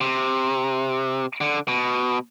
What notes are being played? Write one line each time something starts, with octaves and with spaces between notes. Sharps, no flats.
C3
D3
B2